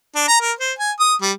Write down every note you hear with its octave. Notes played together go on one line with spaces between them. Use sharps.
D4
A#5
A#4
C5
G#5
D#6
G3